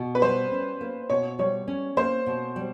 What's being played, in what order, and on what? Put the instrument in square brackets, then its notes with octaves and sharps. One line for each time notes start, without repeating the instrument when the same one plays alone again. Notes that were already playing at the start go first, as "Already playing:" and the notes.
Already playing: [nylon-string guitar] B2
[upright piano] B4
[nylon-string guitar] G3 [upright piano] C5
[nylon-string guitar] C#4
A#3
[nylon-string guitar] B2 [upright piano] C#5
[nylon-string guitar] G3 [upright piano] C#5
[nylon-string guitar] C#4
[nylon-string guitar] A#3 [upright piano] C5
[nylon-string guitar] B2
G3